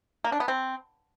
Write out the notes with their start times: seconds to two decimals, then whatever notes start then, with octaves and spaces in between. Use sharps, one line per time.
0.24 A#3
0.32 D4
0.40 B3
0.48 C4